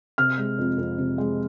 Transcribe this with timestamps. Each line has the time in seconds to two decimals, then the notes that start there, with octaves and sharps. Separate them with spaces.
0.18 C3 F6
0.38 G#3
0.58 F2
0.78 F2
0.98 C3
1.18 G#3